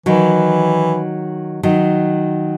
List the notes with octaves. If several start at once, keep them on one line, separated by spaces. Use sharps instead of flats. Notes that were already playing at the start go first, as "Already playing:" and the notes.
D#3 E3 F#3
D#3 F#3